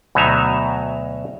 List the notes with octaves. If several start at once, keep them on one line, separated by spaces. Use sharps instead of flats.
D2 B2 F#3 D#4 E5 A#5